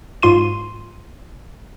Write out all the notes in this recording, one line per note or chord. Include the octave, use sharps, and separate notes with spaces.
G#2 F4 C6 D#7